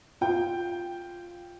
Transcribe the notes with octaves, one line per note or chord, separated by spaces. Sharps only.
F4 G5